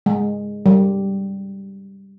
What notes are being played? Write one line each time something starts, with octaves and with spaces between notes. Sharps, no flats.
G#3
G3